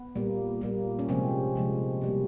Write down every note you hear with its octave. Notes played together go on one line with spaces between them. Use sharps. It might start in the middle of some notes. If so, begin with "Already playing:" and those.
Already playing: B3
A#2 G3 A#3
A#2 G3 A#3
C#4
C3 F3 G#3 C4
C3 F3 G#3
B2 G3 A#3